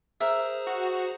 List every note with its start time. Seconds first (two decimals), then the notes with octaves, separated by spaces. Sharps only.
0.20 G#4 A#4 C5 E5 A#5
0.67 F#4